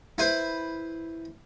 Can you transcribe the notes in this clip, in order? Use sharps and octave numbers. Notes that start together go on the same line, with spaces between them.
E4 B4 C5